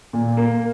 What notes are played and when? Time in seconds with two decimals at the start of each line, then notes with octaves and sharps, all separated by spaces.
0.13 A#2
0.37 A#3